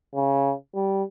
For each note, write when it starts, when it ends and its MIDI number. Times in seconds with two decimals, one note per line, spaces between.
0.15 0.54 49
0.75 1.03 55